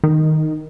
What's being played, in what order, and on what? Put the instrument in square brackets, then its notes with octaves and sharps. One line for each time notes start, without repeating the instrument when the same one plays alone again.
[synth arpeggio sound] D#3